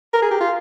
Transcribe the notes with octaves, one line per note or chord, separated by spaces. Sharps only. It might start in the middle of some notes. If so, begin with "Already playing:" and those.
A#4
G#4
G4
F4